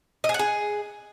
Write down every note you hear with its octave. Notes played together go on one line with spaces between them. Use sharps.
D#5
G#4
F#5
G#4